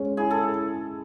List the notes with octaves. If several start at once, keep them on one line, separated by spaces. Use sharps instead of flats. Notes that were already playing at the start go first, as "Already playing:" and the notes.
Already playing: G#3 C#4
E4 G#4
A4